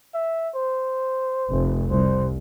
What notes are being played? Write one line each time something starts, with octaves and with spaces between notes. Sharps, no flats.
E5
C5
F1
C2 C5